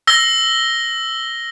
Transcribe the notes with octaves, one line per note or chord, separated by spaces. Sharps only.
E6 A#6 G7